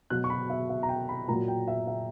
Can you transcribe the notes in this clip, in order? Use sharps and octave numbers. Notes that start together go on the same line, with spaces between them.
B2 F#3 F#6
C#6
B5
E5
E5
A#5
G5
B5
A#2 F#3 A#5
G5
E5
E5